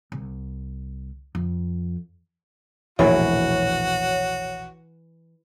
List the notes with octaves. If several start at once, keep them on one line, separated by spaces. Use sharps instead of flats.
C2
F2
E1 A#1 A2 E3 F#4 C#5